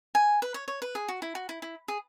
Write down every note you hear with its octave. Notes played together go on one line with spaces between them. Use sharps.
G#5
B4
C#5
C#5
B4
G#4
F#4
E4
F#4
E4
E4
G#4